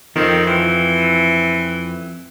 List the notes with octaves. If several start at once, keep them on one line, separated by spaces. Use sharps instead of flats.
F2 D#3 C4
E3